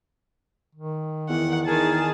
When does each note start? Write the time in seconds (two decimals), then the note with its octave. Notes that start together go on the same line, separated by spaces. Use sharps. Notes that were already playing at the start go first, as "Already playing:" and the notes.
0.75 D#3
1.29 E2 F#5
1.67 D#3 G#4 A#4 A5